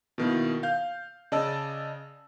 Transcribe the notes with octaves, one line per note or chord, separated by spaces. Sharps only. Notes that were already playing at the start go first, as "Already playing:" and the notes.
B2 D#3 A#3 E4
F5 G6
C#3 D5 D#5 A5 E6